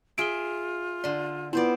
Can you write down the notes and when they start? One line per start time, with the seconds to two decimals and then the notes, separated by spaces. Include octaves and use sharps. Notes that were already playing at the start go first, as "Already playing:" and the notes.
0.18 F4 G#4 E5 D7 G7
1.04 D3 D5 C6
1.53 B3 C4 E4 F4 C5 D5